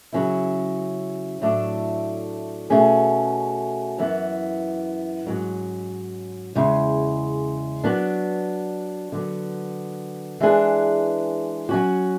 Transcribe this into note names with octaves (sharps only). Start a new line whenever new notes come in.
C#3 F#3 C#4 E4
A2 F#3 A3 D4
B2 A3 C#4 G#4
F#2 E3 B3
G#2 F#3 C#4
E2 C#3 G#3
F#3 B3 D4
D3 F#3 B3
E3 G#3 D4 G#4 B4
F#3 C#4 F#4